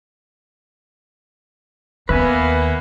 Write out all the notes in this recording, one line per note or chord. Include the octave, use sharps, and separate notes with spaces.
D#2 A#3 B3 B4 E5 G#5